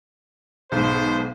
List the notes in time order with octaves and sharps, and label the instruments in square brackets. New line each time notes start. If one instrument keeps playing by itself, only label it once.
[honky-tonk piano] B1 G#2 [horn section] B2 G#4 C5